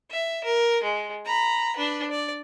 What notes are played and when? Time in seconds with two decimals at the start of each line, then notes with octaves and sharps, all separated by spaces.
0.11 E5
0.44 A#4
0.83 G#3
1.25 A#5 B5
1.76 D4 B4
2.10 D5